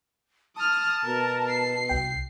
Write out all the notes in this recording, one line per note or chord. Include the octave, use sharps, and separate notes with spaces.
A5 D#6 F6
B2 A#4
C7
C2 G5